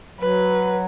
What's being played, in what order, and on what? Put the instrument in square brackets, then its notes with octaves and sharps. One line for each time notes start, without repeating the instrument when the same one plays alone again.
[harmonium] F#3 [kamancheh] B4